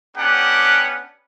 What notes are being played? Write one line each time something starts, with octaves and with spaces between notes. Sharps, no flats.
B3 C#4 D4 G4 F#5